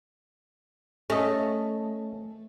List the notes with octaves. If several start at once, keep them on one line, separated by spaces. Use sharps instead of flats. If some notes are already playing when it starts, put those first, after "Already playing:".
A3 C#4 D#5